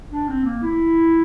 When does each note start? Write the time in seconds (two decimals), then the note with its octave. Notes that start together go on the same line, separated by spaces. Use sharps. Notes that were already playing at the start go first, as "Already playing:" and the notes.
0.11 D4
0.28 C4
0.45 A#3
0.63 E4